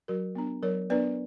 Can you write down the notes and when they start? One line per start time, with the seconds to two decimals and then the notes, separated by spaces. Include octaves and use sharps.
0.08 F#3 F#4 A#4
0.35 B3 D4
0.63 F#3 A#4 C#5
0.90 B3 D4 B4 D5